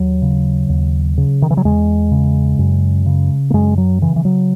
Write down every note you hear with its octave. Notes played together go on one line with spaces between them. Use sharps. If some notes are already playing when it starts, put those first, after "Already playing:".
Already playing: D#2 F#3
C#3
D#2
C#3
D#3
E3
F#3
E2 G#3
C#3
F#2
C#3
A#3
F#2 G#3
F#3
C#3 E3
E3
F#3